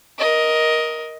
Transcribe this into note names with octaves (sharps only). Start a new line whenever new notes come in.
A#4 D#5